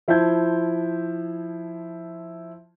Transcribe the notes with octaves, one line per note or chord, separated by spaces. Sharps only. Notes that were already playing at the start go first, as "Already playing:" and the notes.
F3 E4 C5 A5 G6 G#6